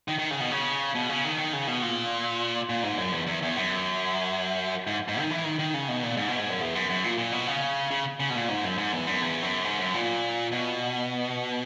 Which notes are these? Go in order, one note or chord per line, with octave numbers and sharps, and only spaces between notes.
D#3
D#3
C#3
B2
C#3
B2
C#3
D#3
D#3
C#3
B2
A#2
A#2
G#2
F#2
E2
E2
E2
F#2
G#2
G#2
D#3
E3
D#3
D#3
C#3
B2
A#2
G#2
B2
G#2
F#2
E2
F#2
F#2
A#2
A#2
B2
C#3
C#3
C#3
B2
A#2
G#2
F#2
G#2
E2
F#2
E2
F#2
G#2
F#2
A#2
B2